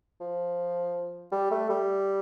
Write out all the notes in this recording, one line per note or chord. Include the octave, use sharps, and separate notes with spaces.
F3
G3
A3
G3